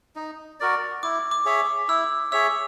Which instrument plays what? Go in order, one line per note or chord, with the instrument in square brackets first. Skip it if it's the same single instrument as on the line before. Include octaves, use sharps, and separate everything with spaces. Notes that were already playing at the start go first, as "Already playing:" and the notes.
[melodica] D#4
F#4 A#4 D5
[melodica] E4 [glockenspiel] D6
[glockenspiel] D6
[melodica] G#4 C#5 E5
[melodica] E4 [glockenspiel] E6
[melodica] G#4 C#5 E5 [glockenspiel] E6